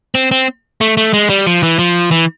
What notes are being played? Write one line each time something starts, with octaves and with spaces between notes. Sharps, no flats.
C4
C4
A3
A3
G#3
G3
F3
E3
F3
E3